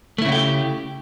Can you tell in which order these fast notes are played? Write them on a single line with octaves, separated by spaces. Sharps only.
A3 E4 C#3 F#4 G4